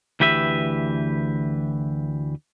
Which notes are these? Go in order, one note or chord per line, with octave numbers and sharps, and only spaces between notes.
D2 E3 G4 B4 E5